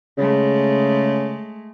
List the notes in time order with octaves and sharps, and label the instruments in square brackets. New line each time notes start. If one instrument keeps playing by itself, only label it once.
[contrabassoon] C#3 [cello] G#3 A3